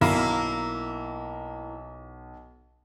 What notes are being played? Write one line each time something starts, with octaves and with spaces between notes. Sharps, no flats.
B1 A#3 E4